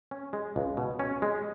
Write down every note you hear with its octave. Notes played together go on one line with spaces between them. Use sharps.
C#4
G#3
C#2
B2
C#4
G#3